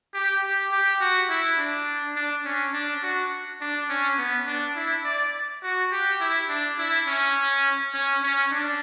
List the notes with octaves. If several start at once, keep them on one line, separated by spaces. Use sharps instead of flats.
G4
G4
G4
F#4
E4
D4
D4
C#4
D4
F#4
D4
C#4
B3
D4
E4
D5
F#4
G4
E4
D4
E4
C#4
C#4
C#4
D4